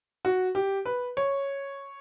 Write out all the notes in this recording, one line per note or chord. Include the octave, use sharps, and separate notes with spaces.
F#4
G4
B4
C#5